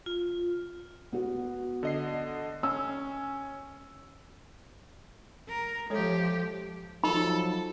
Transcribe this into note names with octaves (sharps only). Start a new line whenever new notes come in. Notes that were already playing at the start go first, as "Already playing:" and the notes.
F4
B3 F#4
D3 D#5 C7
C#4 E6
A#4
F3 G#3 G4 A4 C#5
F3 F#3 D#4 A4 B5